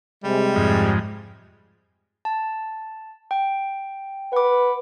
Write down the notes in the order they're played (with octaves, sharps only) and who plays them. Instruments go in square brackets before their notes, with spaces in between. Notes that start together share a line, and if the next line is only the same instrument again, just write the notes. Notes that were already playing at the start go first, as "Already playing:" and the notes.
[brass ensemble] C3 G#3 [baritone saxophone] G3
[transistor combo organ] F2 G#2
[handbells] A5
G5
[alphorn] B4 [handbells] F#5 D6